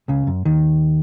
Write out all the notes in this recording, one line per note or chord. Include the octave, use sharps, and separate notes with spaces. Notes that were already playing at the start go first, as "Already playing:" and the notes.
C#2 C#3
F#2
D#2 D#3